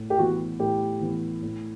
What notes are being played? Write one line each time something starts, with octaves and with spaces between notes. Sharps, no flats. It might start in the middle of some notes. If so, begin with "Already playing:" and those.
Already playing: A2
G4
E3 B3 F#4
A2 G4
E3 B3
A2